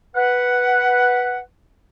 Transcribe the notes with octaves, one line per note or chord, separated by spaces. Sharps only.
B4 F#5